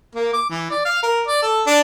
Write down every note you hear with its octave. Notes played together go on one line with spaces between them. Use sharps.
A#3
D6
E3
D5
F5
A#4
D5
A4
D4